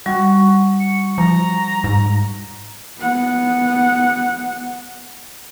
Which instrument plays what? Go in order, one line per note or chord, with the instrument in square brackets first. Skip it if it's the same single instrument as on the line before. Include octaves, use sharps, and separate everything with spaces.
[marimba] G3 [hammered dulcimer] F#4
[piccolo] C#7
[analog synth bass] F3 [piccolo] A#5
[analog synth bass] G#2
[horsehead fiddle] B3 F#5